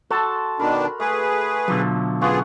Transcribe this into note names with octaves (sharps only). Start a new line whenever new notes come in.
F#4 A4 A5 C6
B2 D#3 D4 A#4 B5
A3 G#4 B4
B2 D3 F3 F#3
B3 C#4 F4 F#4 G#4